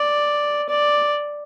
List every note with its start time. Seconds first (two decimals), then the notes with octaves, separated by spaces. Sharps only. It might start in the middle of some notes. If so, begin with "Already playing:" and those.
Already playing: D5
0.69 D5